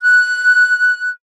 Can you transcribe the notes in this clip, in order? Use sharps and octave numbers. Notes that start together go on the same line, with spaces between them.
F#6